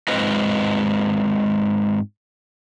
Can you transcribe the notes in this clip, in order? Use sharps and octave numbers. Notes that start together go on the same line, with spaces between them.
G#2 G#3 C4 F4 B4 D#5